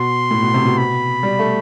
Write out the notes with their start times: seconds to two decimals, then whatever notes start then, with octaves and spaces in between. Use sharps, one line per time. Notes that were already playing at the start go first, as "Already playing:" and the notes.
Already playing: B2 C6
0.31 A2
0.43 B2
0.54 C3
0.66 B2
0.78 B5
1.23 G3
1.39 A3